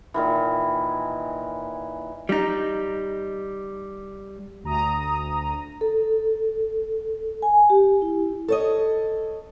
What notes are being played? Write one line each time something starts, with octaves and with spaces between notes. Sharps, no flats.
A#2 D#3 E3
G3 D#4
D2 A#5 D#6
A4
G#5
G4
E4
A4 C#5 D#5